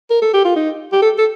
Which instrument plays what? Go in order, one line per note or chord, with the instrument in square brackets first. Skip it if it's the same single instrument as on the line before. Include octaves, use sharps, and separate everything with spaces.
[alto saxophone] A#4
A4
G4
F4
D#4
G4
A4
A4